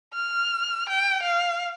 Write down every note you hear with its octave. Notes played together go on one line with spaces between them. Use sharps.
F6
G5
F5